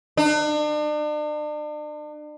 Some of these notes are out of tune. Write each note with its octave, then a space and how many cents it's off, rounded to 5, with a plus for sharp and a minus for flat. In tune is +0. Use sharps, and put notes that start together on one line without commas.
D4 +40